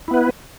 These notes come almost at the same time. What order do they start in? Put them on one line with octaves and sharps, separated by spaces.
E4 B3 B4